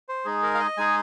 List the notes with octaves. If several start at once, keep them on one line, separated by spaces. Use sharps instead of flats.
C5
G#3 D#4 G#4
A#4
F5
D#5
G#3 D#4 G#4 G#5